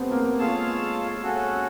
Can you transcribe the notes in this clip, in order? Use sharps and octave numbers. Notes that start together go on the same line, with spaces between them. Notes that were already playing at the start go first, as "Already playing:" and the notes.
Already playing: A3 B3 C4 G4 B4 C5
A#3 A#4
G#3 F4 G#4 A4 C#5 F5 A5
C#4 F#4 A4